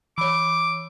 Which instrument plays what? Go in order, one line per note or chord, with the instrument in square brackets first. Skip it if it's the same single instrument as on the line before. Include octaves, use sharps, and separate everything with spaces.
[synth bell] E3 C#5 [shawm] D6